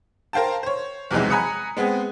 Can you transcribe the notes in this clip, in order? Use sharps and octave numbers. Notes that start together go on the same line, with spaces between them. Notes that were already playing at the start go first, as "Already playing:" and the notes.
A#4 C5 F5 G5 A5
C5 C#5
B1 E2 C3 E3 F#3 G#3
G#5 A#5 B5 D#6 F#6 C#7
G#3 B3 C4 G#4